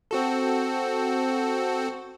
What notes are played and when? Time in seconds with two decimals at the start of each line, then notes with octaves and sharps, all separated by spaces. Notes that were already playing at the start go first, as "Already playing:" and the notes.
0.11 C4 F#4 A4